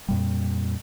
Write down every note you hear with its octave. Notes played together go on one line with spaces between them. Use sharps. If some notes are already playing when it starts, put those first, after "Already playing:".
F2 A#2 G3